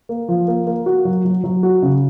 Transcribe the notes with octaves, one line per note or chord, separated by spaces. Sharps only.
A#3
F3
A#3
A#3
F#4
F#3
F#3
F#3
F#4
C#3